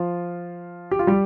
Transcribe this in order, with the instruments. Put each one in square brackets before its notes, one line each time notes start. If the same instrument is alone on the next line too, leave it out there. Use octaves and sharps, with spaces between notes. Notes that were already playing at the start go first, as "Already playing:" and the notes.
Already playing: [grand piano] F3 F4
G4
F4
G3 G4